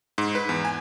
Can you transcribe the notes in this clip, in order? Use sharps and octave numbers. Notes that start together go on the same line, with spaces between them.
G#2
B4
E2
G#5